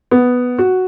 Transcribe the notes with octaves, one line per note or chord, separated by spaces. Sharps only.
B3
F#4